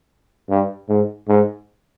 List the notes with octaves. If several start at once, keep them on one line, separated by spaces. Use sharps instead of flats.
G2
G#2
G#2